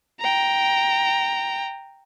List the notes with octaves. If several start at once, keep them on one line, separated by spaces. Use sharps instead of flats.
G5 A#5